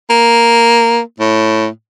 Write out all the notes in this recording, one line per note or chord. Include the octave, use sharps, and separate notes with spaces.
A#3
A2